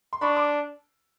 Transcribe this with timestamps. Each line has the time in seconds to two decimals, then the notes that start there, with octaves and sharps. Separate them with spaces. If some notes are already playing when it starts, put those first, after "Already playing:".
0.13 C6
0.21 D4 B5 C#6
0.36 C6 D6